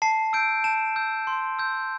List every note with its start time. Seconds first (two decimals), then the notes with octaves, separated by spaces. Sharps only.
0.02 A5 C7
0.33 E6 G6 D7
0.64 A5 E7
0.96 E6 G6
1.27 C6
1.59 E6 G6